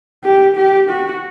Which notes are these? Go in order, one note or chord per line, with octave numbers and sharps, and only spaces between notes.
G4
G4
F#4